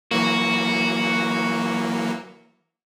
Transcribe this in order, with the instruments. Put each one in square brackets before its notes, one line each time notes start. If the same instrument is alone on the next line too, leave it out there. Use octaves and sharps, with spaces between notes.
[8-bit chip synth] E3 F#3 A#3 [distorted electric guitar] F#4